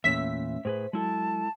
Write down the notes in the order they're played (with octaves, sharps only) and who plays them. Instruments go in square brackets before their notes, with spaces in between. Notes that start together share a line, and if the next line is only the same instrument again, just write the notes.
[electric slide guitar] E2 A#2 [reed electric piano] A3 C#4 [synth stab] E5 B6
[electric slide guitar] A2 G#4 B4 [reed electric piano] C5
[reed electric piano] F#3 [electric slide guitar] G#3 E4 A4 [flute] A5